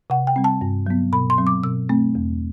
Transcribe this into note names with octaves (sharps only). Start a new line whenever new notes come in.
C3 F#5
G5
G3 C4
A5
G2
F#3 B3
B2 B5
C6
F#3 C4
D6
B2 E6
A3 C4
E2